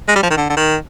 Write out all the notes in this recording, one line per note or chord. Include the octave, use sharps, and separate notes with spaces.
G#3
G3
F3
D#3
D3
D3
D#3